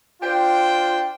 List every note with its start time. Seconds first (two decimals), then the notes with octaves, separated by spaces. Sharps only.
0.22 D4 F4 C5 G5